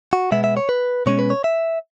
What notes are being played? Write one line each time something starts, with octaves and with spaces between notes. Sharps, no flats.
F#4
B2 G#3 B3 E5
E5
C#5
B4
B2 G#3 C#4 C#5
B4
C#5
E5